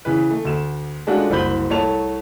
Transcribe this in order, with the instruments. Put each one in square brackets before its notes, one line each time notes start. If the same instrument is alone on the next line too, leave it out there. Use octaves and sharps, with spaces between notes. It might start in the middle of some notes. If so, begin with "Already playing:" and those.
[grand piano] C#3 E3 B4
A3
D2 E7
G#3 A3 C#4 D4 F4 F#4
F#1 C2 C5 B5 G6 F#7
C2 A3 C#5 A5 F7